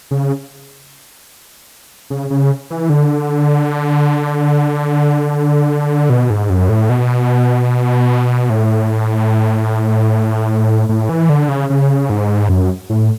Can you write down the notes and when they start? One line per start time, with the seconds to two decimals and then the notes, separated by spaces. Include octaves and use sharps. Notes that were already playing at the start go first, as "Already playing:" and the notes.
0.11 C#3
2.10 C#3
2.30 C#3
2.70 E3
2.90 D3
6.10 B2
6.30 G#2
6.50 F#2
6.69 A2
6.89 B2
8.50 A2
10.89 A2
11.09 E3
11.30 D3
11.48 C#3
11.70 C#3
12.10 G#2
12.49 F#2
12.90 A2